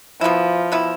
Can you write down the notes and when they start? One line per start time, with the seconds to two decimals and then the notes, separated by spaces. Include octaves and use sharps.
0.21 B2 F3 B3 E4
0.72 B2 B3 E4